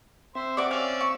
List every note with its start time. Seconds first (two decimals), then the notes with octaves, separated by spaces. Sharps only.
0.35 C4 C5 E5
0.57 F#4 D5 D6
0.71 C#4 D5 F5
1.01 C#6